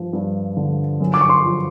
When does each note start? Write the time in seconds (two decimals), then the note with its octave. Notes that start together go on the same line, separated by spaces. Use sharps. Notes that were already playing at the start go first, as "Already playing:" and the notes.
Already playing: G2 F3
0.13 G2
0.57 D3
1.00 F#2
1.14 D6
1.21 C#6
1.29 C6
1.44 F3